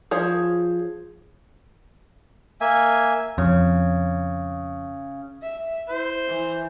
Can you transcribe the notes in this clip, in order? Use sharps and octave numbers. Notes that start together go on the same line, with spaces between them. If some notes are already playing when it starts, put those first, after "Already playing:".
F3 G#4 C#5
A#3 E5 G#5
F2 C#3
E5
E4 C5
E3